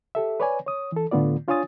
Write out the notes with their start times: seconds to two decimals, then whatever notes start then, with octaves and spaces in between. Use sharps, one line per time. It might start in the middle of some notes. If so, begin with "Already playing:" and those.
0.15 G4 A4 E5
0.40 B4 C#5 D5 G#5
0.66 C#5 D#6
0.92 E3 A4
1.11 A2 D3 A3 B3 F4 D5
1.48 D4 F4 C#5 G#5 D#6 A6